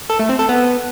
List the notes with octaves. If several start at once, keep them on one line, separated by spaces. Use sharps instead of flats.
A4
A3
C4
A4
B3